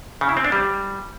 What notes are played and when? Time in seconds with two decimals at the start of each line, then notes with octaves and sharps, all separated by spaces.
0.21 C#3
0.29 E4
0.37 C4
0.44 D4
0.52 G3